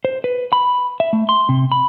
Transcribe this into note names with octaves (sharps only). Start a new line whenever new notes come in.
C5
B4
B5
E5
A3
C6
C3
B5